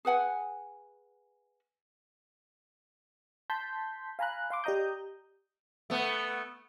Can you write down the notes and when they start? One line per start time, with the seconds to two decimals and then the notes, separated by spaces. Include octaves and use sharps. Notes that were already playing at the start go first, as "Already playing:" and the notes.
0.05 G#4 B4 F#5 G#5
3.50 A5 C6 G6 B6
4.19 F5 G#5 A#5 B5 F#6
4.50 F5 C6 D6
4.64 G4 D5 D#5 A#5 D#6 G6
5.90 A3 B3